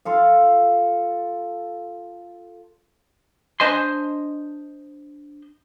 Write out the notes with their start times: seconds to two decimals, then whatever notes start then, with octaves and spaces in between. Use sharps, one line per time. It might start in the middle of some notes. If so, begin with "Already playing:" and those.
0.05 F4 A4 F5
3.60 D4 C5 D#5 G#5 C6